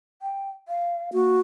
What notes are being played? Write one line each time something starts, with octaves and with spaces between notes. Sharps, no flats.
G5
F5
A#3 F#4